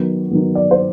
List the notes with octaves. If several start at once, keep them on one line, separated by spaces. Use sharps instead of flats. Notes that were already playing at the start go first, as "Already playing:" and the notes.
Already playing: D#3 F#3 B3
D#3 F#3 B3
D5
C5